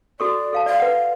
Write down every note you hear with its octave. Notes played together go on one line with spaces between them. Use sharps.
F#4 A4 D5 C#6
A4 F5 A5
D5 F5
B4 F#5